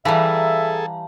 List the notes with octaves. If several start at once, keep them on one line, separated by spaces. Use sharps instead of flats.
E3 G3 G#4 A4 E5 F5 A5 A#5